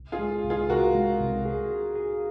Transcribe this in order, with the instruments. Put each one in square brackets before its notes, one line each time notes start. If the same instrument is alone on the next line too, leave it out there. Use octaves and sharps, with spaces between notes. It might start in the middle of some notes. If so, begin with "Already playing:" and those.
Already playing: [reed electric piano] C2
[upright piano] F4 G#4
[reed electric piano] G#3
C2
[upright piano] F4 G#4
[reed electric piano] C2 [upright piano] F#4 A#4
[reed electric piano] G#3
C2
G#4
G#4
G#4